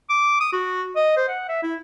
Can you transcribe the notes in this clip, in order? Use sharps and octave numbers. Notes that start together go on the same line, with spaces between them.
D6
D#6
F#4
D#5
C5
F#5
E5
E4